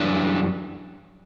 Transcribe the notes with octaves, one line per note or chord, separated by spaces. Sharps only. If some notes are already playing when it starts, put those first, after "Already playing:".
Already playing: F#2 E3 G3 D4